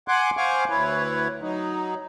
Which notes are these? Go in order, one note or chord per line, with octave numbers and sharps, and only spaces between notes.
F#5 G#5 C6 D6 F#6
C5 F5 F#5 G#5 C#6 D6
D2 E4 B4 C#5
F#3 D#4